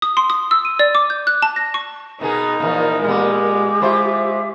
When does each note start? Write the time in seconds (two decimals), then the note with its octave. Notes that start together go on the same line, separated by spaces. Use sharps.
0.02 D#6
0.17 C6
0.30 D#6
0.51 E6
0.65 D#7
0.79 D5
0.95 D6
1.10 G6
1.27 F#6
1.42 A5
1.56 A#6
1.74 C#6
2.21 B2 B3 D#4 G#4 A#4
2.60 A#2 E3 F3
3.04 A#2 G#3 B3 G4
3.82 E4 F4 C5 E5